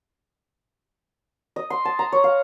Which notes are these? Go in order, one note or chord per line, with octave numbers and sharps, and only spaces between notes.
D#5
C6
A5
A#5
C#5
F5